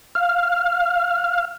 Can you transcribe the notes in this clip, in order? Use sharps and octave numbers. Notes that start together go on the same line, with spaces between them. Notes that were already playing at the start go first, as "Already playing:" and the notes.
F5